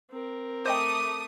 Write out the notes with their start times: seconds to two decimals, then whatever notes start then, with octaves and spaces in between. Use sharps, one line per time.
0.11 C4 A#4
0.66 A3 C5 D#5 G5 D6 D#6